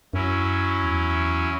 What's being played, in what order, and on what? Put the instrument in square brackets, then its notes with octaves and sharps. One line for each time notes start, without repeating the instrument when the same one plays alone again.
[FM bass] F#2 [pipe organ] F#3 C#4 E4
[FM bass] E2